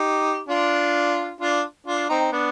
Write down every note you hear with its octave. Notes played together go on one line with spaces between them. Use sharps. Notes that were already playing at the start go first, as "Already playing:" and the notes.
Already playing: D#4 G4
D4 F4
D4 F4
D4 F4
C4 D#4
B3 D4